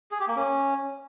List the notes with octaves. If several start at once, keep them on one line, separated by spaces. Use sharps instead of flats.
G#4
G4
A#3
C#4